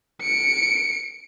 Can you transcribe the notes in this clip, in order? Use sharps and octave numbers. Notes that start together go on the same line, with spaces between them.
C#7 D7